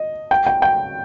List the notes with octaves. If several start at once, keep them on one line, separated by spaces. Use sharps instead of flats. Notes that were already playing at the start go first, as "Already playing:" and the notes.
Already playing: D#5
G5
G5
G5